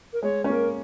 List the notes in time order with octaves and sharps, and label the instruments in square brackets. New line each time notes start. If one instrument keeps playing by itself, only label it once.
[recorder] A#4
[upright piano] G#3 [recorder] C#5
[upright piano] C#4
[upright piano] A#3 [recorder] A#4